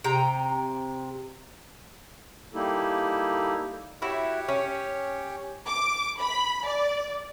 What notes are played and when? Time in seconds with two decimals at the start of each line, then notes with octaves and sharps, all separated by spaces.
0.04 C3 G5 A#5
2.54 G3 A#3 D#4 E4 G4 A4
4.02 E4 F#4 G4 C#5
4.48 C#4
5.66 D6
6.19 B5
6.65 D5